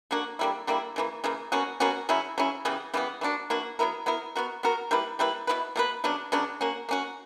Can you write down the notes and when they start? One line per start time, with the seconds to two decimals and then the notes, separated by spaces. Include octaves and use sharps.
0.11 D3 A#3 D4 F#4
0.39 D3 G3 A#3 E4
0.67 D3 G3 A#3 E4
0.96 C#3 E3 A#3
1.24 C#3 E3 A#3
1.52 B2 A#3 C#4 F#4
1.80 B2 A#3 C#4 F#4
2.09 C#3 F#3 C#4 E4
2.38 C#3 F#3 C#4 E4
2.65 C#3 E3 G3 B3
2.94 C#3 E3 G3 B3
3.21 E3 A#3 D4 F#4
3.50 E3 A#3 D4 F#4
3.79 F#3 B3 E4 A#4
4.06 F#3 B3 E4 A#4
4.36 B3 F#4 A#4
4.63 B3 F#4 A#4
4.91 G3 A#3 E4 B4
5.19 G3 A#3 E4 B4
5.47 B2 A#3 E4 B4
5.76 B2 A#3 E4 B4
6.04 C#3 F#3 B3 D4
6.32 C#3 F#3 B3 D4
6.61 A#3 C#4 F#4
6.89 A#3 C#4 F#4